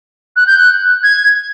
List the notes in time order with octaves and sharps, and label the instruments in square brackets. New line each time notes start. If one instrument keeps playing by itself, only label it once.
[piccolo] F#6
G6
F#6
G#6